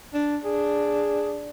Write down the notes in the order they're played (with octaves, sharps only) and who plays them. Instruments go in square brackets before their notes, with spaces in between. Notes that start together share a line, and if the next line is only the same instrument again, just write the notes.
[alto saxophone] D4
[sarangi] D4 [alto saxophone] G#4